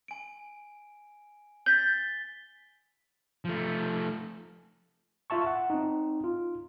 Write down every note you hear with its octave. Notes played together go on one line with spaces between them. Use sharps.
G#5 D7
G6 A6 B6 G7
F3 A3
F4 E5 A5 C#6
F#5
C4 D#4
F4